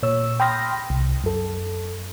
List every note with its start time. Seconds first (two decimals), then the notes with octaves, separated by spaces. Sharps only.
0.03 A#2 C#5 E6
0.40 G5 B5 C6 D#6 F6 A#6
0.90 C2
1.24 F#2 A4